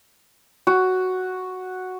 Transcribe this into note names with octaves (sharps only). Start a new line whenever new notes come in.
F#4